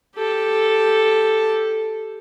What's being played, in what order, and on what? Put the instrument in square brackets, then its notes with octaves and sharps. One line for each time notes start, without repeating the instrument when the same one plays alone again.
[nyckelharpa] G4 A4